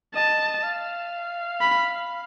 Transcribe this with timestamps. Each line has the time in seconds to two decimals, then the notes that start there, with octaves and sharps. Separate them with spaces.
0.15 D#5 A5
0.63 F5
1.61 B5